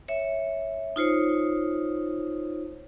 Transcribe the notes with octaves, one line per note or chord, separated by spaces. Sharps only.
C#5 E5
D#4 F4 C5 C#5